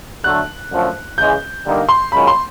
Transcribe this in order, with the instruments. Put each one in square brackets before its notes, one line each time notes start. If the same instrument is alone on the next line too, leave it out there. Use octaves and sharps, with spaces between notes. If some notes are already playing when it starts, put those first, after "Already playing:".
[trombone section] D3 F#3 A3 [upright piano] F#6
[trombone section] F#2 D3 F3 A3
[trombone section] C#3 E3 G#3 [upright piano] G6
[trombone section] D3 G3 A#3 D#4
[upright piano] C6
[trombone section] F#2 D#3 G#3 C#4 F4 [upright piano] B5
[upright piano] C6